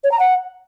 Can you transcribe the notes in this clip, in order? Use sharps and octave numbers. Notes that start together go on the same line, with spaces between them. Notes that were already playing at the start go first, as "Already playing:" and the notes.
C#5
A#5
F#5